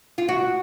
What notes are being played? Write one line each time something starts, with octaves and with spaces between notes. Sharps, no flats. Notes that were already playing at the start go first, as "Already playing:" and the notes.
F4
F#4